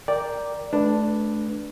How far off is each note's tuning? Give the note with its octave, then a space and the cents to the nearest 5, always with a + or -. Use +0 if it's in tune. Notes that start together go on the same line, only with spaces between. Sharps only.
A#4 +5 D5 +0 G5 +0
A3 -30 D4 +0 B4 +0